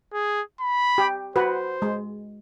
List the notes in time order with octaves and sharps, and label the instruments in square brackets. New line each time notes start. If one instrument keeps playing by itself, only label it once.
[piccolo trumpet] G#4
B5
[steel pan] G4
[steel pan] F#4 B4 [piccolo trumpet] C5
[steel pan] G#3